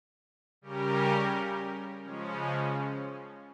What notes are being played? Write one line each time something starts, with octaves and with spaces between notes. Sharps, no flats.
C#3 G3 C#4 G4 A#4
C#3 F3 G#3 C#4